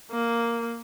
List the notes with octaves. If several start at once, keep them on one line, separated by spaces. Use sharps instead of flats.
A#3